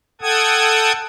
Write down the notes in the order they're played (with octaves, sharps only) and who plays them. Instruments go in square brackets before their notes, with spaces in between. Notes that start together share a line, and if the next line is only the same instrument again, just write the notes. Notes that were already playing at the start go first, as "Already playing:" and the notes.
[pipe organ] A4 F#5 G5 A5 D#6 G#6